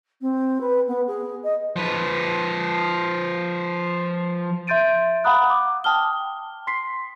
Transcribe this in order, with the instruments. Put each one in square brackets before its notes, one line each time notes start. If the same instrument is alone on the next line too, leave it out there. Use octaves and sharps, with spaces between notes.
[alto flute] C4
B4
B3
G#4
D#5
[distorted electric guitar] F3 B4
[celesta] E5 C6 G6 A6 D7 D#7
F5 F#5 A#5 B5 D#6 F#6
D6
G5 A5 D#6 F6 G7
C6 B6 C7